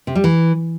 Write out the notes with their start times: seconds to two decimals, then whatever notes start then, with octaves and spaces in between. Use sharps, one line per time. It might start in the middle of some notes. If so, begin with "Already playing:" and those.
0.07 C3
0.15 G3
0.24 E3